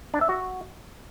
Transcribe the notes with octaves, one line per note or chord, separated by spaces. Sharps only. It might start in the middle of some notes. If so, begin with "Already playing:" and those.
D4
E5
F#4